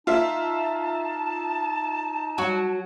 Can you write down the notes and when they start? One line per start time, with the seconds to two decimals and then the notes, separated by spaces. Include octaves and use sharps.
0.07 D#4 F4 E5 A5
2.38 F#3 F#4